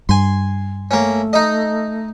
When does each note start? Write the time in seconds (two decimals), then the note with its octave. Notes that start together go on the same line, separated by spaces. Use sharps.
0.09 G2 G#5 C6
0.91 A3 A#3 C#4
1.33 D#4 D#5